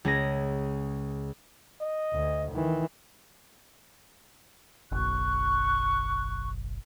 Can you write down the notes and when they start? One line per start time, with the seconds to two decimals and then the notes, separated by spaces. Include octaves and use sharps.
0.05 C#2 G#4 A#6
1.81 D#5
2.13 D2
2.52 D#3 E3
4.92 F#1 B1 C#6 F#6